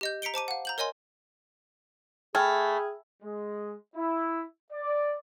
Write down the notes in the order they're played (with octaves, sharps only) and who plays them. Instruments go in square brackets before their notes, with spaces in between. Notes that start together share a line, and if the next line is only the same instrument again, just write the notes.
[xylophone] G4 D#5 G6
A#5 B6 C#7 D7 G7
C5 A5 D6 D#7
F5 F#5
A#5 G6 F#7
A#4 C#5 D#5 G#5 C6
[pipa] A3 [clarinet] G#4 [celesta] G5 F6 G#6 [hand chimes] G#5 B5
[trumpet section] G#3
E4
D5